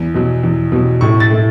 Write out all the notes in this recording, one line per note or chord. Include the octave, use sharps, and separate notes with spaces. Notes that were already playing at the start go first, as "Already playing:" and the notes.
Already playing: E2
B2 F#3
E2
B2 F#3
A2 C#6
A6
A3 E4